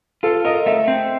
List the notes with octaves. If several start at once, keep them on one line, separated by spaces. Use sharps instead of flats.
F4 A4
A#4 D#5
A3 E5
C4